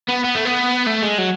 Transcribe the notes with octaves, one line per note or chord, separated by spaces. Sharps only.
B3
B3
A3
B3
A3
G#3
F#3